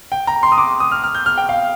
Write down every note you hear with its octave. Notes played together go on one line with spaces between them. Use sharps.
G5
A#5
C6
D#6
D6
D#6
F6
F6
G6
F6
G5
F5